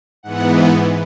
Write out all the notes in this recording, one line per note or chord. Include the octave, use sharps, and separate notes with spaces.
G#2 E3 B3 F#5